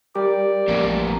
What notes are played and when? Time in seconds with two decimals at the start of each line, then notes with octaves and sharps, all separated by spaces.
0.15 G3 G4 A#4 D5
0.68 A1 F2 A#2